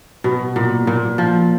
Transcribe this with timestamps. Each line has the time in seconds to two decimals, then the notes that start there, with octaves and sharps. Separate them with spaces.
0.24 B2
0.56 A#2
0.87 A#2
1.18 F3